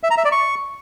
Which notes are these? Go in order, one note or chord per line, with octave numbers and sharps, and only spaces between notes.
E5
A#5
E5
D5
C#6